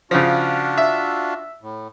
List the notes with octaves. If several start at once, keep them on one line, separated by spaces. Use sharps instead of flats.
C#3 F3 D4 F4 F#4
E5
A2